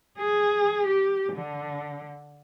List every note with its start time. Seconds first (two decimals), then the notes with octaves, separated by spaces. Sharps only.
0.19 G#4
0.88 G4
1.33 D3